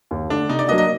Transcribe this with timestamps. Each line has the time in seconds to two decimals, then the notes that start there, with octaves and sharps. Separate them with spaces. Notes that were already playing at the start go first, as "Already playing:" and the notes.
0.11 D#2
0.30 D3 A3 D4
0.49 C3 D#4
0.59 D5
0.68 F#3 A#3 D4 F#4 D#5
0.78 D#5